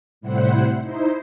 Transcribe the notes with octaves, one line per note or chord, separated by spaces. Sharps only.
A2 C3 G3 E4 C5 F#5
D#4 E4 C5